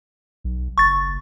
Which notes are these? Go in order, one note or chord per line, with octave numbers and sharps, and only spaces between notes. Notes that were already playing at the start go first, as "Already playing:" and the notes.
B1
F#1 C#6 A6